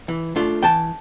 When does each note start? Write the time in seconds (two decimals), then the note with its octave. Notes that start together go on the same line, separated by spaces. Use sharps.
0.08 E3
0.36 A3 D4 F4
0.63 E3 G5 A5